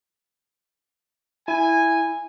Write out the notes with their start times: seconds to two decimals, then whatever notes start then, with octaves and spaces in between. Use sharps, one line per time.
1.48 E4 G#5